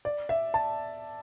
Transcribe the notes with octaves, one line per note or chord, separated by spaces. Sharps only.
D5
E5
A5